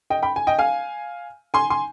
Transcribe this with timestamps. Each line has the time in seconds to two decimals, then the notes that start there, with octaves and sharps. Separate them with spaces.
0.10 D#5 G5
0.22 G5 B5
0.36 G#5
0.47 D#5 G5
0.59 F5 G#5
1.54 G#5 C6
1.70 G#5 C6